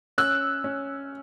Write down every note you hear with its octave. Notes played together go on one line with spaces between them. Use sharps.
C#4 E6 F#6
C#4